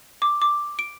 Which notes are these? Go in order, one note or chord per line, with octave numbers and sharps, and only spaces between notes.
D6
D6
D7